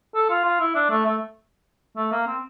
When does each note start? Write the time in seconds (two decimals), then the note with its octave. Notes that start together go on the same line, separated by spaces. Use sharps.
0.15 A4
0.30 F4
0.45 F4
0.60 E4
0.75 D4
0.90 A3
1.05 A3
1.97 A3
2.12 A#3
2.27 C4